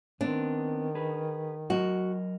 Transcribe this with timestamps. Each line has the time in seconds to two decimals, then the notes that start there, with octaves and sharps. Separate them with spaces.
0.21 D#3 B3 C4 D4
0.95 G#4 B4
1.70 F#3 F#4 A#4 D#5